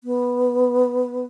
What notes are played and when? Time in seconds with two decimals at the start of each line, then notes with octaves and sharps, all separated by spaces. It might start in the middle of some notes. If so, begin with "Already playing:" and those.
0.04 B3